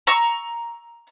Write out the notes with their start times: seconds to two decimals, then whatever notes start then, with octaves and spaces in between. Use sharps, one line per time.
0.07 A#5 C#6 E6